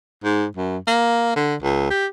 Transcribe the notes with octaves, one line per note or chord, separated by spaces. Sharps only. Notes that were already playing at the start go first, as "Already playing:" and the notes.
G#2
F#2
A#3
D3
C#2
G4